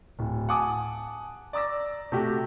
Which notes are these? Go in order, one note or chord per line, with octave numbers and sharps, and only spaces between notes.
D1
F#5 G#5 A5 D6 D#6
D5 A#5 D6 E6 A#6
C3 A3 C4 F#4 G4